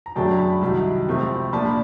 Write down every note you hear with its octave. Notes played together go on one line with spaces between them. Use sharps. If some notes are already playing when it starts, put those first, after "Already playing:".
A#5
F#2 C#3 F#3 A3 D4 G5 A5
A5 B5
C2 C3 D#3 F#3
C#2 C3 F3 A3 C4
A#2 F3 A#3 D4 A5 B5